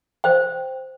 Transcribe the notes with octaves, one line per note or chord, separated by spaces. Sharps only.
C5 G5